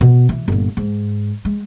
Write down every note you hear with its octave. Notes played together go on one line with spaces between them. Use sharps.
B2
E3
G1 A#2
G#2
G#3